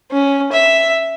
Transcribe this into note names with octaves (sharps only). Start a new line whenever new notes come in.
C#4
E5